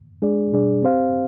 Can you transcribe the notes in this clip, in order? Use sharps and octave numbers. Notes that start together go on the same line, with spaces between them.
G#3 D4 G#4 D5
B2 G3 D4 G#4 D5
C4 G4 C5 F5